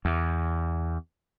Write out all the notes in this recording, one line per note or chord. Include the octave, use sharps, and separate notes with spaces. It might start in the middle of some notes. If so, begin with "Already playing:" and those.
E2